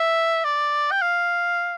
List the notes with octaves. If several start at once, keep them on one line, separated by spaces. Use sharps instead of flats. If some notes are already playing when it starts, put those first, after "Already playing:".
Already playing: E5
D5
G5
F5